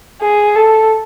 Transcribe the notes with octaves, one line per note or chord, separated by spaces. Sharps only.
G#4
A4